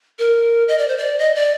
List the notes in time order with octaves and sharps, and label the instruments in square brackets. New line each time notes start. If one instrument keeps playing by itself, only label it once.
[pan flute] A#4
D#5
D5
C5
D5
D#5
D5